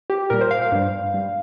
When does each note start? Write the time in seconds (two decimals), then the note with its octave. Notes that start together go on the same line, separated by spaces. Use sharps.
0.10 G4
0.30 A#2 G3 A#4
0.41 C5
0.51 F5
0.62 F5
0.72 G2 G3
1.14 G3